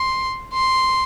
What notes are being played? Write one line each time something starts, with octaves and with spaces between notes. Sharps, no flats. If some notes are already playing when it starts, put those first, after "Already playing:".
Already playing: C6
C6